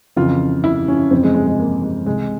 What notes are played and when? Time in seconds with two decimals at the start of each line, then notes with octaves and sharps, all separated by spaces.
0.16 F2 C#3 E3 F4
0.64 E4
0.88 C#4
1.11 F2 C3 E3 C4
1.23 G#3
1.35 G#3
1.47 G#3
1.59 A#3
1.83 G#3
2.06 C2 C3 E3 G#3